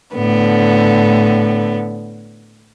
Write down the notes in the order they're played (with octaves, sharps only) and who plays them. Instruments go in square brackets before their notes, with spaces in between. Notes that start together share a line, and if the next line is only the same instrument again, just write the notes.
[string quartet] A2 D3 B3